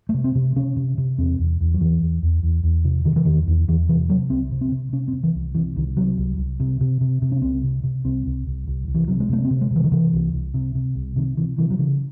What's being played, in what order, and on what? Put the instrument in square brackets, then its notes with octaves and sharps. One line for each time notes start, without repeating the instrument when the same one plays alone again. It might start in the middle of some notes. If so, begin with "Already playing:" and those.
[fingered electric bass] A3
C3
C4
C3
C3 C#4
C3
C3
E2 C4
E2
E2
F#3
E2 E3
E2
E2
E2
E2
C3
C3 D#3
E3
E2 D#3
E2
E2 E3
C3 E3
C3 F#3
C2 C4
C3
C4
C3
C3 C#4
C4
C3
E3
C2
C3 E3
C2 D#3
C3 F#3
C2
C2
C3
C3
C3
C3
C#4
C2 C4
C3
C3
C2 C4
C2
C2
C2
C2
E3
C3 F#3
G#3
C3 A3
C4
C3
G#3
C3
E3
D#3
C3 E3
C2
C2
C3
C3
C2
C3 D#3
C3 E3
C3 E3
F#3
C#3 E3